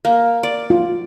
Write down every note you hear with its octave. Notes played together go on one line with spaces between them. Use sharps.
A#3
D5
F4